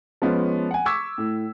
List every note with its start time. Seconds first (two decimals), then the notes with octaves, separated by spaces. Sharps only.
0.22 F3 G#3 B3 C#4
0.71 F#5 G#5
0.85 C#6 D6 E6 G#6 B6
1.18 A2